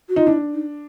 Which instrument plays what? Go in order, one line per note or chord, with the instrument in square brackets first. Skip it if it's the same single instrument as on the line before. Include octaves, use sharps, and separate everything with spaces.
[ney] F#4
[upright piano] D#4 [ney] F4
[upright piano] D4 [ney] E4
[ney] D#4